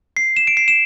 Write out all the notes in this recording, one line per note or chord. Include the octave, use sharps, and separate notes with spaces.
C7
E7
D7
C7
E7